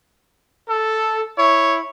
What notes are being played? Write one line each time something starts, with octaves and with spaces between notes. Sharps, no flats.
A4
E4 C#5